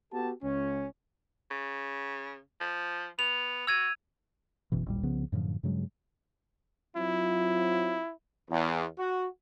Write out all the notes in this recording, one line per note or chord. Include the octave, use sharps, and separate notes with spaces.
B3 F#4 G4 A4 A5
C#2 C#4
C#3
F3
B3 F7
F#4 E6 G#6 D#7
F#1 F#2 B2 E3
A1 D#2 A#2 G3
C2 C#3 F3 B3
F#2 A2 D3 F3
G2 C#3 F#3 G#3
F#3 C4 E4 F4
E2
F#4